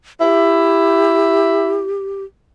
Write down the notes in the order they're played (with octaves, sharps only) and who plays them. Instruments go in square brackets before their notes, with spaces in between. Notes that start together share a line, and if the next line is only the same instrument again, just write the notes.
[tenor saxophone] E4 [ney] G4